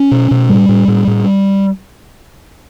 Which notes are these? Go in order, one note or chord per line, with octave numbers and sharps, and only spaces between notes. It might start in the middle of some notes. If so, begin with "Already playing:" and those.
Already playing: C#4
B2
B2
A2 G3
A2
A2
A2